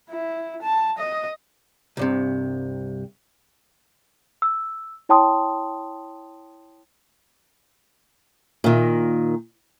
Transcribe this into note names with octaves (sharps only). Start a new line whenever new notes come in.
E4
A5
D#5
C2 G2 C3
E6
E4 C#5 G5 A5 C6 D#6
A#2 D#3